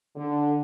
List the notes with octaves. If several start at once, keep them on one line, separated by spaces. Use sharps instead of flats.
D3